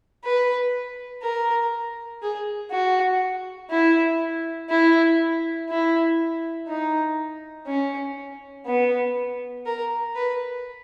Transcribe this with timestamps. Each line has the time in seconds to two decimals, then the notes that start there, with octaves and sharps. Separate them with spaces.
0.24 B4
1.23 A#4
2.22 G#4
2.71 F#4
3.70 E4
4.70 E4
5.69 E4
6.68 D#4
7.67 C#4
8.66 B3
9.66 A#4
10.16 B4